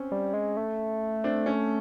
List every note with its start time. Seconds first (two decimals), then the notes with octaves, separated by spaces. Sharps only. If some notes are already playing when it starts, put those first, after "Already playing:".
Already playing: C4 C#4
0.12 G3
0.34 G#3
0.57 A3
1.24 C4 D4
1.46 C#4